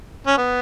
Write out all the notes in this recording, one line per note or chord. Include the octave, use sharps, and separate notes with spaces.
C#4
B3